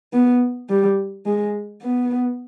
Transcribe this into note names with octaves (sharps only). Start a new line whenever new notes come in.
B3
G3
G#3
B3